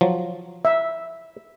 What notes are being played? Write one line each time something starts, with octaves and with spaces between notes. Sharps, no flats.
F3 F#3
E5